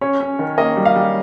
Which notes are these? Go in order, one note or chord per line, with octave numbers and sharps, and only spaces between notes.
C#4 C#5
C#4
D#3
A#3 D#5
G3
F5
G3